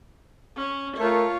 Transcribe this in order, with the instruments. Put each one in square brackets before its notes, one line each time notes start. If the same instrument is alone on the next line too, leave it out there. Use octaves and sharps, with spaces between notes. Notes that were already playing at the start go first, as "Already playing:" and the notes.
[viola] C#4
[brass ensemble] A3 A#4 [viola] F4 C#5